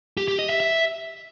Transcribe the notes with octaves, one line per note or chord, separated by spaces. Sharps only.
G4
G4
D#5
E5
E5